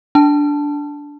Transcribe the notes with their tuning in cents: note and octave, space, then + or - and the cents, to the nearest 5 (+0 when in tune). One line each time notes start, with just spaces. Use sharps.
D4 -10 A5 +0